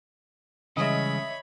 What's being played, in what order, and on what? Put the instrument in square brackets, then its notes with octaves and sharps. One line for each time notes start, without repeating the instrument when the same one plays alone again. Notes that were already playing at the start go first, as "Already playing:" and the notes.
[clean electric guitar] C#3 [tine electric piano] E3 G3 G#3 [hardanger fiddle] C#5 B5 [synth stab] D#5 E5